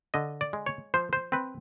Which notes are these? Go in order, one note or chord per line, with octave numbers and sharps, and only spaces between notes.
D3 D#5
D5
G#3
C#5
F3 C5
C5
C4 B4